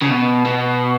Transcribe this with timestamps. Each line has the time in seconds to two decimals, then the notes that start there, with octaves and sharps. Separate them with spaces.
0.02 C#3
0.10 B2
0.46 B2